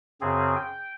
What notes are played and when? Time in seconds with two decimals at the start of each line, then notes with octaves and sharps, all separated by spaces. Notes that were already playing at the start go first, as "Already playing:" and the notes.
0.21 F#2 C#3 C4 G#4
0.56 G5